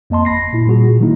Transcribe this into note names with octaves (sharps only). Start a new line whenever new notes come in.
F2 A#3 D#5 A5 C6
G1 B5 A#6 C7
A#2 E4
A#2 G3 F#4 G#4
A#2
D#3 F#3 G#3 A#3 D#4 E4